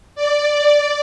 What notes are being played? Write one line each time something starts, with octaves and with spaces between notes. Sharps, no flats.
D5